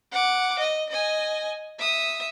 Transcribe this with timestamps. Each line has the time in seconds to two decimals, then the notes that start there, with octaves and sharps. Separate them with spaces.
0.12 F#5 D6
0.59 D#5
0.89 D#5 G#5
1.79 E5 D#6